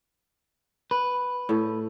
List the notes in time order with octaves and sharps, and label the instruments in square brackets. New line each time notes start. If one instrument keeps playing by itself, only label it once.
[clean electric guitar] B4
[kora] A2 A4